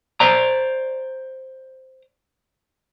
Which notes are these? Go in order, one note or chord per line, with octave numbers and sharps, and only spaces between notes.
C5 D5 A#5